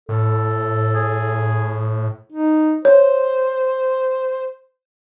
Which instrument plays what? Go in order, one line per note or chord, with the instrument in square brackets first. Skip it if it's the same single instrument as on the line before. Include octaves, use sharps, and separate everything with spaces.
[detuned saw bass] A2 [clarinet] A4
[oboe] G#4
[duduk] D#4
[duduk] C5 [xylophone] C#5